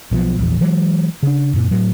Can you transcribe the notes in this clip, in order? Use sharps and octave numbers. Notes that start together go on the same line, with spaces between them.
B1 B2 F3
A#1 E2
E3 F#3 G#3
C#3 D4
F#2 A#2
A2 F#3